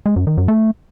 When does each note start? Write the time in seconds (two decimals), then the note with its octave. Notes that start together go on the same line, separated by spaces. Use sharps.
0.06 G#3
0.16 F#2
0.27 D#3
0.38 F#2
0.48 A3